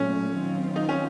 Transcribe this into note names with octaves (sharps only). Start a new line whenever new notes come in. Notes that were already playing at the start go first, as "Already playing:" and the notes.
Already playing: A#2 F#3 A3 C#4
D#3 F#3 C4 F4
D#4
C#4